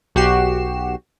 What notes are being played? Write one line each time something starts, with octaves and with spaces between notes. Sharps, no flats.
B1 F#4 G4 C7 E7